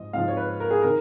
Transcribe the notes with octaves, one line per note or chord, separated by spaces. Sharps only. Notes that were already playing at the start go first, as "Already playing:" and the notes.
Already playing: G#2 F3 D#5
G#2 F3 F5
C#5
B4
A#4
G#4
D#3 A#4